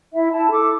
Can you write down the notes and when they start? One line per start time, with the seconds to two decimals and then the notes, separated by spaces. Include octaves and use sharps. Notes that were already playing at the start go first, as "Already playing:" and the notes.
0.11 E4 E5
0.31 E4 A5
0.50 A4 D6